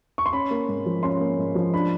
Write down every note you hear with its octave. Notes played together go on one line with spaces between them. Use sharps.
C#6
C6
C#4 B5
A#3
G#2
F3
C#4 C6
A#3
G#2
F3
D4 B5